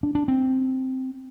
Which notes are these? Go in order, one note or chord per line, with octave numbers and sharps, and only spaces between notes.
D4
D4
C4